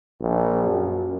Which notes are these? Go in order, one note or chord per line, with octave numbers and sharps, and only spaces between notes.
A#1
F#2